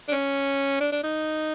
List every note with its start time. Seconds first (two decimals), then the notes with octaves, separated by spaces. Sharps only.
0.08 D4
0.12 C#4
0.80 D4
0.92 D4
1.03 D#4